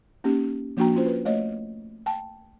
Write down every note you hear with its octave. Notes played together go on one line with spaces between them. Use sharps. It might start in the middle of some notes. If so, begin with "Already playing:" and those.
A#3 C#4 D#4 G4
F3 A#3 D4 F#4 G5 A#5
C#4 F4 C5
B4
A3 C#5 D#5
G5 A5